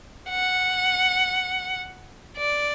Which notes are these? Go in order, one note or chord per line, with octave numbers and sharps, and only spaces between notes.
F#5
D5